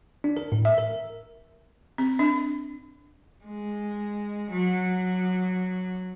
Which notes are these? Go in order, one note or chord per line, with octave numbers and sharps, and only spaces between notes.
D4
A#4
A2
E5
A#4
C4
D4
G#3
F#3